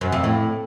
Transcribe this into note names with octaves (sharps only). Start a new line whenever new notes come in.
F#2
F2
A2